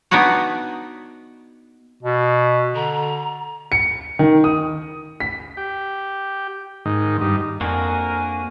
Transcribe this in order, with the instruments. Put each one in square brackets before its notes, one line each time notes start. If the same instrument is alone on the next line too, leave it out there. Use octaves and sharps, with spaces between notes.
[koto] B3 D4 D#4 F#4 C#5
[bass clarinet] B2
[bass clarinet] D3 [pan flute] A#5
[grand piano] C#7
D#3
D#6
B6
[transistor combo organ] G4
G#2 D#3
G2 D#4
[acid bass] F2 [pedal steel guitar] A#3 D4 F#4 [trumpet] A#4 [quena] G#5